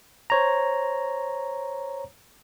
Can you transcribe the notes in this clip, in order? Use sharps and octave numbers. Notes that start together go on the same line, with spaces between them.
C5 C#5 A#5